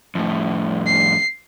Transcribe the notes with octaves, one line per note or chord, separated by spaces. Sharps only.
F2 A2
C7